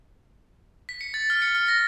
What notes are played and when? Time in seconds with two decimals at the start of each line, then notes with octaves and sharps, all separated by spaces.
0.89 B6
1.01 C#7
1.14 A6
1.30 F6
1.42 C#7
1.55 F6
1.68 A#6